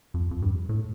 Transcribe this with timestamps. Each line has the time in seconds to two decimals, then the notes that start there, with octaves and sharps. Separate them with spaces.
0.14 F2
0.31 F2
0.42 G2
0.69 A2